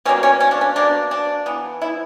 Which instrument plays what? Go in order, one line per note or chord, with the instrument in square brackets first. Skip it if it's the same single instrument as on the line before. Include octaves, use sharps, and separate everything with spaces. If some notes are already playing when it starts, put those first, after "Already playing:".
[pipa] B2 G3 A#3 C#4
C#4
C#4
D4
C#4
B2 A#3 D4
D4
E3 B3
E4